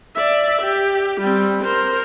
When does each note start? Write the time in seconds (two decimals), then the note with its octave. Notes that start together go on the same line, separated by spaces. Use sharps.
0.15 D5 E5
0.61 G4
1.20 G3 C4
1.63 A#4 C5